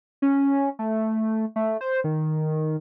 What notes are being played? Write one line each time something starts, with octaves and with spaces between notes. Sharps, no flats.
C#4
A3
A3
C5
D#3